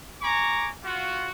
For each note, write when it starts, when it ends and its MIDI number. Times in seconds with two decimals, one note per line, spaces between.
0.22 0.70 80
0.22 0.70 82
0.22 0.70 85
0.22 0.70 86
0.84 1.31 65
0.84 1.31 66